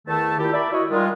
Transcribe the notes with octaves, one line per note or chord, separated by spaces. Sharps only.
E2 D#3 A3 A5
A#2 E4 G4
A#4 D5 E5 B5
E4 F#4 C#5 D#5
D#3 G3 G#3 F4